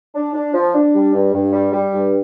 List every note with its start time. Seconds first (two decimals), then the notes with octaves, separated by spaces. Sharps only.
0.15 D4
0.33 D4
0.54 F3
0.74 D4
0.94 G3
1.14 G2
1.33 G2
1.52 G3
1.72 G3
1.93 G2